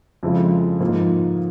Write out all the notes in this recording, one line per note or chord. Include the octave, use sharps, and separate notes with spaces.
F2 C#3 F3 G#3 E4
G#2 F3 A#3 F4